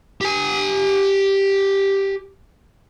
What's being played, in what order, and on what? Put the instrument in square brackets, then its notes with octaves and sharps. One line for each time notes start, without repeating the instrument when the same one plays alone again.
[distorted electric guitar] G4 G#5